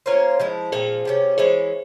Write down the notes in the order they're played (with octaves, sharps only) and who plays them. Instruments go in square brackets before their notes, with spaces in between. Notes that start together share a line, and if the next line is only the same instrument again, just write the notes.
[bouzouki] A#3 C#4 F4 C5
F3 G#3 E4
[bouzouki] A#2 F3 C4 [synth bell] G#4 C5
[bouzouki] C3 G3 C#4
[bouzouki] E3 G#3 C#4 E4 [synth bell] G#4 C5